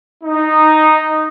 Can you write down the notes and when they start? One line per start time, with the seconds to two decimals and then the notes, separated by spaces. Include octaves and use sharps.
0.24 D#4